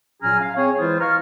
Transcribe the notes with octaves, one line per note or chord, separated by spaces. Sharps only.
A#2 F#3 C#4 G#4 A#5 F6
F5
C4 G#4 C#5
E3 G#3 E4 F4 G#4 C5
F5 A#5 C#6 F6